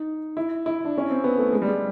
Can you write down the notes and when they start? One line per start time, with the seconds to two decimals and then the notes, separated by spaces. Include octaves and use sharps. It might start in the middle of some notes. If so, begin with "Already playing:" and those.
Already playing: D#4
0.37 E4
0.66 E4
0.85 D4
0.98 C#4
1.10 C4
1.24 B3
1.38 A3
1.53 G#3
1.62 G3
1.67 G#3